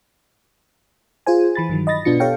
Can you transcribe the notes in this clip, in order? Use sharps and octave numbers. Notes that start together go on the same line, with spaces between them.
F4 G#4 C5 G#5
E3 B5 A6
G2 D#3 F#3
D#5 B5 A6 A#6
B2 B3 D4 F4 C#7
G4 A4 C#5 F5 G5